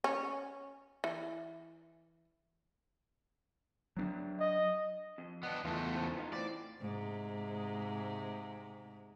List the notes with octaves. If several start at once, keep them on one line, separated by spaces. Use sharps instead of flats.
C#4
E3
F#3 C4 D4
D#5
F2
B3 D4 D#5
E2 A3 F4
G#2 C#3 F3
B3 D#4 F4
A2 C4 D5
G#2 C3